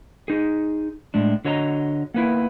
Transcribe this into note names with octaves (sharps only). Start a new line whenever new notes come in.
D#4 G#4
A2 G#3 D4
D3 F#4 C#5 D#5 A5 A#5
A#3 B3 E4